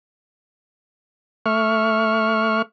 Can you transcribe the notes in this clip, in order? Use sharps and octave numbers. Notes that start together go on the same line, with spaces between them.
A3 E5 C#6 F6